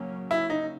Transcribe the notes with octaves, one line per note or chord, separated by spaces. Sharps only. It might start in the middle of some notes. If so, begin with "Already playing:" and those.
Already playing: C#3 F#3 A#3 C#4
E4
D#4